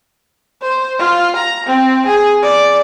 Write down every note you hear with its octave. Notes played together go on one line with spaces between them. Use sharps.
C5
F4
A#5
C4
G#4
D5